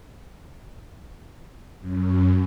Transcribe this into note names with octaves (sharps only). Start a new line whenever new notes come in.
F#2